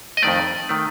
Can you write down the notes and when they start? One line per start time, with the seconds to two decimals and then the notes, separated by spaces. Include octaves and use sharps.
0.17 D#5
0.22 F2 D#3 A3 D5
0.69 D#3 A3